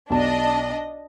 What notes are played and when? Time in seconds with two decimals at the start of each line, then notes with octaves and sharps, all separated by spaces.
0.10 B1 D4 D#5 A5